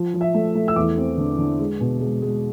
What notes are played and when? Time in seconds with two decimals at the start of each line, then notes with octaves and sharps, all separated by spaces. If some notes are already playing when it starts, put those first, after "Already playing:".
Already playing: F3
0.14 F3
0.21 E5
0.34 A3
0.55 A3
0.68 E6
0.76 E2 D6
0.97 C4
1.18 D3
1.39 D3
1.59 G#3
1.80 B2
2.01 G#3
2.22 G#3